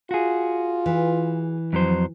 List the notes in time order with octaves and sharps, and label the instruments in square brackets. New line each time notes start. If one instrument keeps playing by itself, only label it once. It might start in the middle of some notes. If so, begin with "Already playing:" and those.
[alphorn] F4 [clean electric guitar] F#4 G#4
[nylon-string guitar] E3
[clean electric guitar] F2 F#3 C5